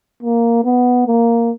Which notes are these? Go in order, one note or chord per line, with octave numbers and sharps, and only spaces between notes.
A#3
B3
A#3